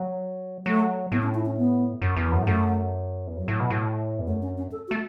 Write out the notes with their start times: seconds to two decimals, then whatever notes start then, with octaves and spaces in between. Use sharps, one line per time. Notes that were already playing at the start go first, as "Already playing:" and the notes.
Already playing: F#3
0.66 F#3 A3
1.12 A2 B3
1.23 C#4
1.34 E4
1.46 C#4
1.57 B3
2.02 F#2
2.16 E2
2.26 E3
2.32 F#2 F#3
2.42 A2
2.47 F#2 A3
3.27 E2
3.37 F#2 F#3
3.48 A2
3.60 B2
3.70 A2
4.19 E2
4.27 F#2 A3
4.42 C#4
4.57 C#4
4.72 A4
4.88 F#4
4.91 A3